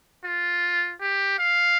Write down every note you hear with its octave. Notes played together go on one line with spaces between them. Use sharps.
F4
G4
F5